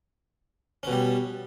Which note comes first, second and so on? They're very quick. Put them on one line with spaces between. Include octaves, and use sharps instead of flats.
C#4 B2 G3